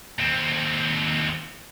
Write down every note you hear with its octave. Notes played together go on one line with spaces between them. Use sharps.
D#2 C4